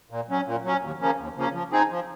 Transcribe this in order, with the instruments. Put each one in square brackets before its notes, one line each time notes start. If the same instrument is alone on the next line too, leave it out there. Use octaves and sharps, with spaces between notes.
[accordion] A#2
F#3 C#4
A#2
F#3 C#4
D#2
C#3 F3 A#3 C#4
D#2
C#3 F3 A#3 C#4
F3
C4 D#4 G#4
F3